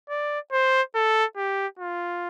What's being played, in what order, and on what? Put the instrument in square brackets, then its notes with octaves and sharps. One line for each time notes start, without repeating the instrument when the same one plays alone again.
[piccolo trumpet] D5
C5
A4
G4
F4